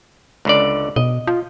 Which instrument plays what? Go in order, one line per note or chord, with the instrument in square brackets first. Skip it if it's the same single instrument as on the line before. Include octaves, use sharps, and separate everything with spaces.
[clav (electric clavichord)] C#2 D3 D5
[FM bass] B2 [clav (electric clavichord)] D#5
[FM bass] F4